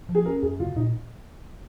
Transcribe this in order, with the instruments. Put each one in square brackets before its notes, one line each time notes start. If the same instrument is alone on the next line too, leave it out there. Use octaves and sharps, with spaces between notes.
[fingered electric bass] F3
[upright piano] G#4
[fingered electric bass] C#4 [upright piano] A#4
[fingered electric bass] F#2 [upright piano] G#4
[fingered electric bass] C#3 [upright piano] F4
[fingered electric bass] A#2 [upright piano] D#4